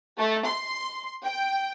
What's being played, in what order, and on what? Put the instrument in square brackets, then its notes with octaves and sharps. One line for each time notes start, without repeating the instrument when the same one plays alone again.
[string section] A3
C6
G5